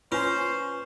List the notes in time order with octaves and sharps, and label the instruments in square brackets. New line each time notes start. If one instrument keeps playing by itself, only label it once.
[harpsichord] C#4 [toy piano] F4 [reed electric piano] B4 G#5 [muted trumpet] C5